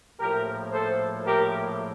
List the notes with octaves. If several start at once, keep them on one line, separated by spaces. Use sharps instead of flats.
A#1 A2 F3 G4 A#4
A4 C5
G4 A#4